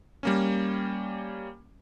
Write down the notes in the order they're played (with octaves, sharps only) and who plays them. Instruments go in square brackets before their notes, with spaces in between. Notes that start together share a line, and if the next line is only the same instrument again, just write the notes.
[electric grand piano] G3 A#3 C#4